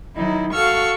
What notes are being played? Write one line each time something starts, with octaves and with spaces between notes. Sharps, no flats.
D#3 F#3 D#4 E4
F#4 A4 F5 C#6 E6 F6